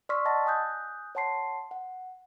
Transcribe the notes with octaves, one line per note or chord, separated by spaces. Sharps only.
D5 C6 C#6 E6 F6 B6
D#5 F#5 A5 E6 A6 A#6
G#5 D#6 F#6 G6
C#5 F#5 A5 C6 C7
F#5